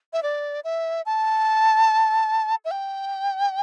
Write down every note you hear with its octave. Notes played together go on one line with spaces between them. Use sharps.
E5
D5
E5
A5
E5
G5